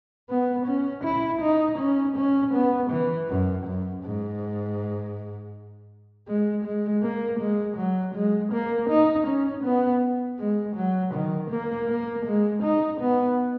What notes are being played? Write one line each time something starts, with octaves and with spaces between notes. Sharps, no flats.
B3
C#4
E4
D#4
C#4
C#4
B3
E3
F#2
F#2
G#2
G#3
G#3
A#3
G#3
F#3
G#3
A#3
D#4
C#4
B3
G#3
F#3
D#3
A#3
A#3
G#3
D#4
B3